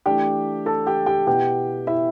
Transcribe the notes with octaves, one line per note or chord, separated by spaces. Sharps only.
E3 A3 D4 G4 G5
A4 A5
G4 G5
G4 G5
B2 B3 E4 G4 G5
E4 E5